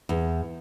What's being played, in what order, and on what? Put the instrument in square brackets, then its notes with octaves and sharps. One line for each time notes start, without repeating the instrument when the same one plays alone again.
[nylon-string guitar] E2